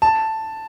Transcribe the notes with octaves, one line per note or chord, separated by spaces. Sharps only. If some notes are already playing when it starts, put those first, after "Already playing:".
A5